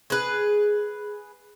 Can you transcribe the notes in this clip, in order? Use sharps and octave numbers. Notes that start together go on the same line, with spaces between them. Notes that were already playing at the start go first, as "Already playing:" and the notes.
G#4 B4